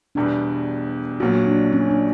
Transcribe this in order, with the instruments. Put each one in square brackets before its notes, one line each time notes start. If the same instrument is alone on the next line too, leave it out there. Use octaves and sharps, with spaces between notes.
[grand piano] E1 E2 B2 G3 [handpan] D4
[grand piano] A#1 A#2 F#3 [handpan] F#4
[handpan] D4
C#4
D4